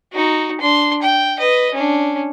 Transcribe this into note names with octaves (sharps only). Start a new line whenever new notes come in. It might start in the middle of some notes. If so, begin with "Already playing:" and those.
D#4 F#4
D4 C6
G5
B4 D#5
C#4 D4